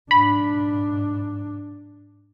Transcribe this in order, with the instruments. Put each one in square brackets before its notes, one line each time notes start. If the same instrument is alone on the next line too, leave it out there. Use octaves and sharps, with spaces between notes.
[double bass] G#2 D4 [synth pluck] B5